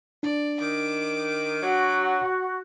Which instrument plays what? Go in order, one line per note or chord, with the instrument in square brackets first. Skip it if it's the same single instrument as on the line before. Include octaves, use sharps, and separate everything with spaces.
[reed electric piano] D4 [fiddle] D5
[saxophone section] D#3 [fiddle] D6
[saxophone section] F#3 [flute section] F#4